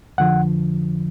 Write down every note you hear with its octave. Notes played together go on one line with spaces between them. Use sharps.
F2 D3 F3 F#5